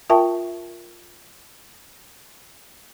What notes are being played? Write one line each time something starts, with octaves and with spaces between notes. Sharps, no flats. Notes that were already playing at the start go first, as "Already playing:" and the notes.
F4 A#4 E5 G5 A5 C#6